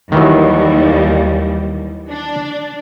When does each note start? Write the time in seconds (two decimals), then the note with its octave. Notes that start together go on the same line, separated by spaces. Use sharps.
0.12 D#2 D#3 E3 F#3 G3
2.10 D4